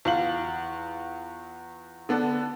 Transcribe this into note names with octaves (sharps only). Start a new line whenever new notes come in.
E2 F4 F#7
D3 B3 D4